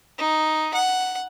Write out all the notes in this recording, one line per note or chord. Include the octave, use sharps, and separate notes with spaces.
D#4
F#5